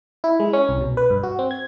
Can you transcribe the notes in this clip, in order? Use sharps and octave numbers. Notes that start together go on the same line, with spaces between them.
E4
G#3
C#4
C2
B2
B4
G2
F#4
C4
G#6